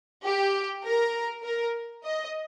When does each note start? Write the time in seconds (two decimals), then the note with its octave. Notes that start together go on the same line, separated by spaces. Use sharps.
0.22 G4
0.82 A#4
1.43 A#4
2.04 D#5